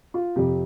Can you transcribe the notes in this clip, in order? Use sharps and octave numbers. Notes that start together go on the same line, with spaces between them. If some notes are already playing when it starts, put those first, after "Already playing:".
F4
F2 C3 G4